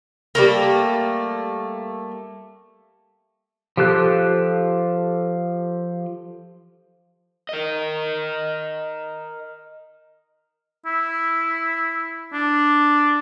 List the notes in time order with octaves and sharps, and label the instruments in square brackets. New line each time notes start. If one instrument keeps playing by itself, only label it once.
[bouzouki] G3 A3 A#3
[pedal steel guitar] F3 G4 A4 F#6
[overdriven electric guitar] A#4 D#5
[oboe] E4
D4